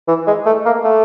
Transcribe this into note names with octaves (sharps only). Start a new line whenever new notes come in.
E3
G#3
A3
A#3
A3